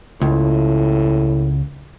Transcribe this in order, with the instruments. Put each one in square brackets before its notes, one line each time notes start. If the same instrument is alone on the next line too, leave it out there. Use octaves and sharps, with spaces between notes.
[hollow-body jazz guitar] C#2 [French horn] A2